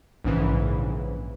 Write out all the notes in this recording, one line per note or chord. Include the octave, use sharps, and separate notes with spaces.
A#1 G#2 C#3 E3